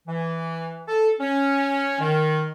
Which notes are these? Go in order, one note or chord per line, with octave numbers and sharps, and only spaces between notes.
E3
A4
C#4
D#3